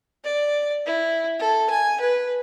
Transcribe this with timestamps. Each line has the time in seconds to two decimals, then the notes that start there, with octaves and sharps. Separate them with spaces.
0.24 D5
0.86 E4
1.39 A4
1.70 G#5
2.00 B4